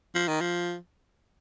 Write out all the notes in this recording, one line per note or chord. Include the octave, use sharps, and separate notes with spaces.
F3
D#3
F3